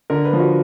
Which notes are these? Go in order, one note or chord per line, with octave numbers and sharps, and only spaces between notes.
D3 A#4
B4
F3
F#4